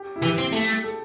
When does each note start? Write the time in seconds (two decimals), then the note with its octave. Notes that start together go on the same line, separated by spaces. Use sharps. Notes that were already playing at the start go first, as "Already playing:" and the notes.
Already playing: G4
0.16 E4
0.22 E3 G4
0.38 C4
0.53 A3
0.84 A4